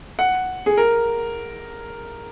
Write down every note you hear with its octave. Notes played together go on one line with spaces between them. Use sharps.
F#5
G#4
A#4